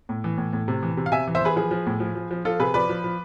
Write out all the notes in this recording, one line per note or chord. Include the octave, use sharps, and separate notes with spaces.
A2
E3
A2
A2
C3
E3
C3
F5
C3 E5 G#5
E3
C5 E5
E3 G#4 B4
F3 G#4 B4
F3
A2
F3
F3
F3
F3 F4 A4
C3 G#4 B4
F3 B4 D5
F3
F3